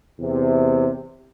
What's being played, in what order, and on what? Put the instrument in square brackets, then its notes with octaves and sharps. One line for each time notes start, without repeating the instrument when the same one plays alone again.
[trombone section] E2 C3